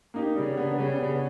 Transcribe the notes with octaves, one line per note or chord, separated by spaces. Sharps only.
A#3 D#4 G4
C#3 G3
B3 D4
C#3 G3
B3 D4